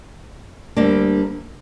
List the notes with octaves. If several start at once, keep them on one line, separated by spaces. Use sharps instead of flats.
D2 D3 G3 A#3 D4